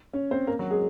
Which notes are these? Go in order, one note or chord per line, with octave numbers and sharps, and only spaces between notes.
C#4 C#5
C4 C5
A#3 A#4
F#3 F#4
G#3 G#4